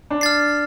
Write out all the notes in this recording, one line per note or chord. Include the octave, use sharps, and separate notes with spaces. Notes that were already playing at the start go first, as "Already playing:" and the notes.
D4
F6 A6 C7